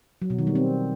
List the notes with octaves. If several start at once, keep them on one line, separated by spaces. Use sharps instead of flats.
F#3
B2
D#3
G3
C4